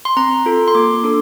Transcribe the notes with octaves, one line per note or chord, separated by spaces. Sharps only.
C6
C4 A#5
F4 A4
C6
A#3 D6
D4 A4